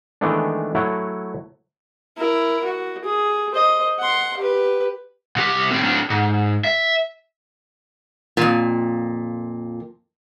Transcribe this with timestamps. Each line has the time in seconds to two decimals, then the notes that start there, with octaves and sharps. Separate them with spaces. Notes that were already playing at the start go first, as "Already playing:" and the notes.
0.21 D#3 E3 G#3 A3 B3 D4
0.75 F#3 A3 E4 C#5 F#5
2.17 E4 A#4
2.64 F#4
3.04 G#4
3.53 C5 D#5
3.99 F#5 C6
4.37 G4 B4
5.36 C2 G4
5.71 A2 C4
5.83 A2 D4
6.10 G#2
6.65 E5
8.37 F2 A#2